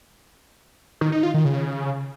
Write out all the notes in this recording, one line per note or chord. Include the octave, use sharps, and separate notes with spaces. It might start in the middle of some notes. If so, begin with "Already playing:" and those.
D#3
D#4
F4
D#3
C#3